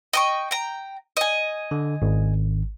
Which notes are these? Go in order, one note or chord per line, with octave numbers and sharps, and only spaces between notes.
D#5 G5 C#6
G5 A#5
D#5 G#5
D3
G#1